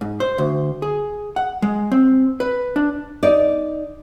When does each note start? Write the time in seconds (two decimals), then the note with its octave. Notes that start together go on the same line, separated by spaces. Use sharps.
0.01 G#2
0.20 C5
0.38 D2
0.82 G#4
1.36 F#5
1.62 G#3
1.92 C4
2.40 B4
2.76 D4
3.23 D#4 D5